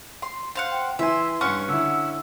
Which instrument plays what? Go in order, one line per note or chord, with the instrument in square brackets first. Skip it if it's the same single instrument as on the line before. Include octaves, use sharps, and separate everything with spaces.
[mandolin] C6
C5 F5 F#5
[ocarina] G5
[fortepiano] E3 E4 G#5 [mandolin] E5 [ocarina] C6
[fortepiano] G2 C#6 [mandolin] C#4 F#5
[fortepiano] D3 E4 [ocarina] E6